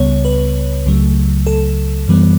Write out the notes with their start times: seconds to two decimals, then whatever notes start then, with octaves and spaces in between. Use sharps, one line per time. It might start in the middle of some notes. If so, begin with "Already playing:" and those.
Already playing: C#2 C#3 G3 B3 C#5
0.25 B4
0.86 C#2 C#3 F#3 A3
1.47 A4
2.08 F#2 E3 G3 B3